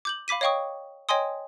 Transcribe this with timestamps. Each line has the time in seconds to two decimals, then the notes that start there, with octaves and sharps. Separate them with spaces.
0.05 D6 G6 F#7
0.28 F5 B5 D6 B6 D#7
0.41 C#5 D#5 F5 G5 C#6 D#6
1.09 C#5 D#5 G5 G#5 C6 D#6